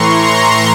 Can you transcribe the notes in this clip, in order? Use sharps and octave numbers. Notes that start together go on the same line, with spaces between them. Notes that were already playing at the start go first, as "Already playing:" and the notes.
Already playing: A2 E3 A#5 C6 C#6
C6